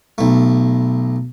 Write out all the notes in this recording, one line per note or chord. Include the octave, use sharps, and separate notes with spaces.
B1 A3